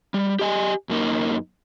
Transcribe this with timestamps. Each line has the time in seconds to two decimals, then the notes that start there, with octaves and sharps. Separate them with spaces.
0.14 G3
0.39 G4 D#5 G#5
0.89 F#2 A#3 D#4